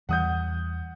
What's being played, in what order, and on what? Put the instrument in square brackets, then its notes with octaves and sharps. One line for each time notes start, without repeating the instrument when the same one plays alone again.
[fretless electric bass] E2 E3 G3 [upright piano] F#5 D#6 G6